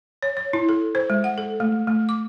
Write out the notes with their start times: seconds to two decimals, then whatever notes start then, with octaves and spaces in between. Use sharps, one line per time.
0.23 C#5
0.37 C#5
0.53 E4
0.69 A4
0.95 C5
1.10 G#3
1.24 F#5
1.38 A4
1.60 A3
1.87 A3
2.09 D6